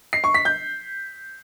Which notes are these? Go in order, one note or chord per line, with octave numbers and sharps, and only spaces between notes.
C7
C#6
B6
G6